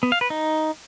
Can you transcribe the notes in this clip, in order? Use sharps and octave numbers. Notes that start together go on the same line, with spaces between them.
B3
F5
B4
D#4